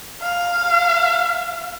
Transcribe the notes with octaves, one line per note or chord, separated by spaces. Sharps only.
F5